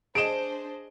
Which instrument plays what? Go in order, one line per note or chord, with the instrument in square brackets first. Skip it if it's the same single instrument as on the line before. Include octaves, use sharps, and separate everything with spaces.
[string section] D4 C5 [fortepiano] G#4 D#5 [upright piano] D7 E7